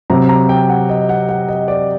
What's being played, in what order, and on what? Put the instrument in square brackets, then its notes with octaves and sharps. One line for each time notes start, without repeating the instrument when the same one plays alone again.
[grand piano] C3 F#3 C4 A#5
A#5
G5
F#5
D#5
F#5
F#5
D#5
D5